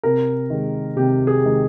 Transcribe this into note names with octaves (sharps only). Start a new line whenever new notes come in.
C3 A#4
D#3 G#3
C3 G4
G#4
D#3 G#3